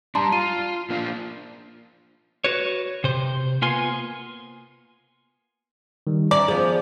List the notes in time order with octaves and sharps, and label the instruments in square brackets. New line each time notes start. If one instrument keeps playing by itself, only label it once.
[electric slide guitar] G3 D4 [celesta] A5 A#5 C6
[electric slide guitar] F4 [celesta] D#7
[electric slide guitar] A#3 D4 F4
[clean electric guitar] F#4 B4 C#5
C3 C5
A#3 B3 F4 G#5 C6
[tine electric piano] D#3 G3
[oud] C#4 D4 E4 [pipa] D5 [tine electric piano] A#5
[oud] F3 B3 [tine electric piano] G#4